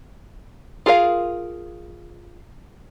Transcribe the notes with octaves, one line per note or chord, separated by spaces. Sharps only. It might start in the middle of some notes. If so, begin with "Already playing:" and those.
F4 G#4 A#4 C#5 F5